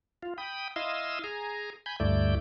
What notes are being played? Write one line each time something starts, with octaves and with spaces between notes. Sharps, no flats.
F4
G5 B5 D#6
E4 D#5 F5 C6 D#6 E6
G#4 G#5 A#5
G#5 B5 G6
D2 G2 A3 E4 D5 G6